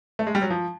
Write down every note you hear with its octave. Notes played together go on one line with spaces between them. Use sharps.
A3
G#3
G3
F#3
F3